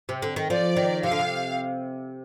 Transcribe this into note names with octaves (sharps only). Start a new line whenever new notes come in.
C3
D3
D#3
F3 D5
D#3
C3 F5
D3
C3